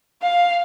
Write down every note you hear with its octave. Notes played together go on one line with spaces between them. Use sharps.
F5